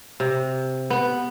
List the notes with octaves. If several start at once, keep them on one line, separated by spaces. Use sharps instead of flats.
C3
B3